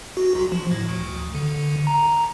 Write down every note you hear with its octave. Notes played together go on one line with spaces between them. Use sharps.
F#4
B1
F3
A2
D2
D3
A#5